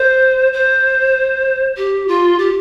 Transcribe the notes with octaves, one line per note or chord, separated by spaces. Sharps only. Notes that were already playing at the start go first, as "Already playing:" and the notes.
Already playing: C5
C5
G4
F4
G4